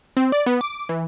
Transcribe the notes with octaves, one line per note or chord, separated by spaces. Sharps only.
C4
D5
B3
D6
E3